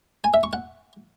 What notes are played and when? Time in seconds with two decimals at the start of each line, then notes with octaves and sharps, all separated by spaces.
0.24 G#5
0.34 E5
0.43 C#6
0.53 F#5